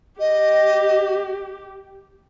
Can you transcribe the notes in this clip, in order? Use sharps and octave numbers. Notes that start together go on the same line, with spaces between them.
G4 D#5